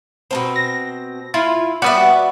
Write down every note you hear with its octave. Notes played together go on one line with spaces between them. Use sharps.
B2 A#3 C4
A#6
E4 F4
G3 B3 F#4 D5 E5